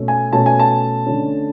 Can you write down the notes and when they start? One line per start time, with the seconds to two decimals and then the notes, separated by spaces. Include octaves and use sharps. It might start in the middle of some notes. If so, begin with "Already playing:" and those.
Already playing: B2 A3 C#4
0.08 G#5
0.32 B2 A3 C#4 A5
0.46 G#5
0.59 A5
1.06 D3 A3 C#4